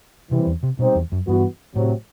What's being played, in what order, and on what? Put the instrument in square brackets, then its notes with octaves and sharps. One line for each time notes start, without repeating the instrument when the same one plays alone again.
[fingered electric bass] C3 [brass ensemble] E3 G3 C4
[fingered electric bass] E2
C3
[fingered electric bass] B2 [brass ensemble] G3 C4 D#4 G4 C5
[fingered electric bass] E2
F#2
[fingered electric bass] G2 [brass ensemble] E3 B3 F#4
[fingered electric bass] A2 [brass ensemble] C3 F#3 C4